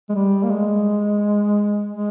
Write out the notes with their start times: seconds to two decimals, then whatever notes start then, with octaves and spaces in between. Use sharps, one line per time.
0.09 G#3
0.15 G3
0.43 A#3
0.50 G#3
1.91 G#3